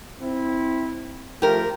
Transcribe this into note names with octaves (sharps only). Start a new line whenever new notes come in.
C4 E4
F3 A3 F4 G4 A#4